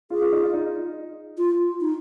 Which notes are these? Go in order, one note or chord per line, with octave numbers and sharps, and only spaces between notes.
F4 G#4
F4
D#4
F4
D#4
F4
D#4